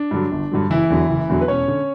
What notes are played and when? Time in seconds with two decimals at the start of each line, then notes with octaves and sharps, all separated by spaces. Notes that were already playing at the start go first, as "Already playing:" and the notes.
Already playing: D4
0.11 G2 D3 F#3
0.32 G1
0.52 G2 D3 F#3
0.70 F#1 E3 E4
0.90 E2 D3 F#3
1.10 F#1
1.29 E2 D3 F#3
1.41 B4
1.48 E1 C#4 C#5
1.68 D3